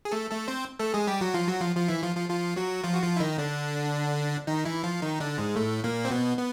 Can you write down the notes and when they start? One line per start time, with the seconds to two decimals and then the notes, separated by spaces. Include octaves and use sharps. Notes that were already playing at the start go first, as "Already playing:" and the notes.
0.05 G#4
0.12 A3 A4
0.30 A3 A4
0.48 C4 C5
0.79 A3 A4
0.94 G#3 G#4
1.07 G3 G4
1.21 F#3 F#4
1.34 F3 F4
1.47 F#3 F#4
1.61 F3 F4
1.76 F3 F4
1.88 E3 E4
2.03 F3 F4
2.16 F3 F4
2.29 F3 F4
2.56 F#3 F#4
2.84 F3 F4
2.94 F#4
3.02 F3 F4
3.16 E4
3.20 D#3 D#4
3.38 D3 D4
4.47 D#3 D#4
4.65 E3 E4
4.83 F3 F4
5.02 D#3 D#4
5.20 D3 D4
5.38 G#2 G#3
5.56 A2 A3
5.84 A#2 A#3
6.05 C4
6.11 B2 B3
6.37 B3